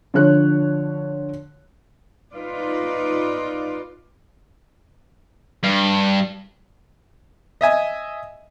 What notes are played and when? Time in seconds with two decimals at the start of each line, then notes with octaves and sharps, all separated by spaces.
0.14 D3 F3 C#5 F#6
2.33 D#4 F4 B4 D5
5.63 G2
7.61 D#5 E5 G#5